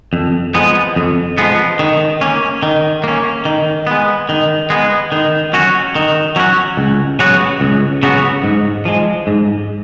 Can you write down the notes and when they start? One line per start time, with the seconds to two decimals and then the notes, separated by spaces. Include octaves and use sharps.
0.13 F2
0.54 F3 G#3 B3
0.96 F2
1.38 F3 G#3 B3
1.79 D#3
2.21 A#3 C#4
2.63 D#3
3.04 A#3 C#4
3.45 D#3
3.87 G#3 B3
4.29 D#3
4.70 G#3 B3
5.12 D#3
5.53 F#3 C#4 F#4
5.95 D#3
6.36 F#3 C#4 F#4
6.77 C#2
7.19 C#3 F#3 B3 F#4
7.61 C#2
8.03 C#3 F#3 B3 F#4
8.44 G#2
8.85 F3 G#3
9.27 G#2